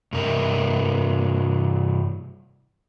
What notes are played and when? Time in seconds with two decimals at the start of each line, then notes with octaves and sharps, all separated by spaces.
0.13 G2 C3 A#4 D#5 E5